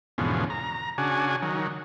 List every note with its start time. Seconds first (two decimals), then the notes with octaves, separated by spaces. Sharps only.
0.18 E2 G#2 B2 D3 F3 C#4
0.50 A#5
0.98 C#3 D4 F#4 G#5
1.42 D#3 F#3